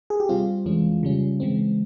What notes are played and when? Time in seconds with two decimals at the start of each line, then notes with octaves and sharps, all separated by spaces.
0.10 G#4
0.20 G4
0.29 C3 G3 C4 F4
0.65 F2 E3 G#3 C#4
1.03 C#3 G3 C#4
1.40 C#3 E3 G#3 C4